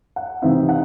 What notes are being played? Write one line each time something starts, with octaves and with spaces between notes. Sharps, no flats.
F#5
C3 E3 C4 D#4 E5
F#5